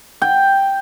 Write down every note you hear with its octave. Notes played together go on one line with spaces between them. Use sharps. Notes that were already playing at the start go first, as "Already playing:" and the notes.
G5